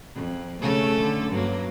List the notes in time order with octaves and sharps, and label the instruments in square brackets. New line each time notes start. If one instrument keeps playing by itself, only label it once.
[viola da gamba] F2
[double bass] C#3 [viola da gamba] A3 C#4 A4
[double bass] D3
[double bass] G2 [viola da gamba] F#3 A#3